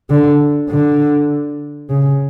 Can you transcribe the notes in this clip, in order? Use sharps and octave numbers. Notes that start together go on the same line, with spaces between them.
D3
D3
C#3